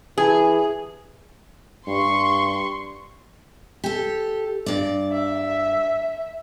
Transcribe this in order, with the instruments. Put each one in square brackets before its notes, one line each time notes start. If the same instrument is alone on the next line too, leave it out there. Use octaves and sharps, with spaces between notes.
[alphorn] E3 [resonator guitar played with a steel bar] G#4
[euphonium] G2 [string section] C6 C#6
[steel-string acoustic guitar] G4 A4
G2 D5
[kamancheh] E5